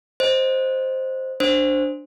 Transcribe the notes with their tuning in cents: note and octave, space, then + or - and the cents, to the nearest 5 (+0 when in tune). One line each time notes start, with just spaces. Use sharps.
C5 +0 D#5 +0
D4 +0 C5 +0